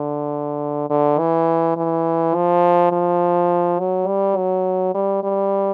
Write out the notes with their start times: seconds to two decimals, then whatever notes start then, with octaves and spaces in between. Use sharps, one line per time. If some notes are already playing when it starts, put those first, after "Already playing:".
Already playing: D3
0.90 D3
1.19 E3
1.77 E3
2.35 F3
2.92 F3
3.80 F#3
4.07 G3
4.37 F#3
4.95 G3
5.23 G3